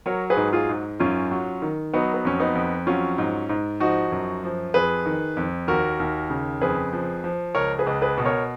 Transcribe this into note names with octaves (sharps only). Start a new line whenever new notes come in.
F#3 A#4 C#5
G#4 B4
G#2
F4 G#4
G#2
F#2 C#4 F4
F#3
D#3
F#3 B3 D#4
B3
F2 C#4
B3 D#4
F2
F#3 C#4 F4
G#2
G#2
F3 D#4 F#4
F#2
F3
F2 G#4 B4
D#3
F2
D#2 F#4 A#4
D#2
C#3
F2 G#4 B4
F3
F3
C#2 A#4 C#5
G#4 B4
C#2
G#4 B4
B2
A#4 C#5